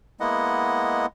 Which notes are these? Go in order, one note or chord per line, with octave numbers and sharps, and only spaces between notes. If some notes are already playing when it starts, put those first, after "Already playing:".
G#3 A#3 B3 E4 D#5 F#5